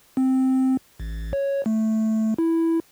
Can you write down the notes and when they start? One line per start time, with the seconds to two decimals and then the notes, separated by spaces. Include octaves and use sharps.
0.17 C4
1.00 A1
1.33 C#5
1.66 A3
2.39 E4